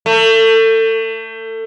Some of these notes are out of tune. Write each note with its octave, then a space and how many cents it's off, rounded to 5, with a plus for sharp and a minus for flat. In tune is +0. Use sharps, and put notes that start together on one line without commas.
A3 +30